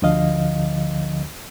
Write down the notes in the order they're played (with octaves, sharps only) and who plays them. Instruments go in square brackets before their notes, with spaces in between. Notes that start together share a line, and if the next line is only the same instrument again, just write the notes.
[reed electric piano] D2 D3 F3 D#5 F5